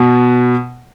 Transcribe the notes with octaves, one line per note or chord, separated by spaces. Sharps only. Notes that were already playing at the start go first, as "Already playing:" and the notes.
Already playing: B2